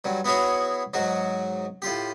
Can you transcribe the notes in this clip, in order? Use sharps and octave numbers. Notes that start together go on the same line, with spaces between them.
G2 F#3
B3 E4 F#4 G#4 C#5
G#2 F#3 F#4
A2 F4 G4